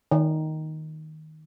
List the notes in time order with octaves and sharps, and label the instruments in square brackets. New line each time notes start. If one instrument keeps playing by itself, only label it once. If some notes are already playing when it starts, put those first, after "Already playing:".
[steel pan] D#3